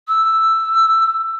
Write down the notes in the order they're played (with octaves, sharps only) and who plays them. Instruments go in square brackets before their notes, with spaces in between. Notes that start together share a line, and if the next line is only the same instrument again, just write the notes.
[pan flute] E6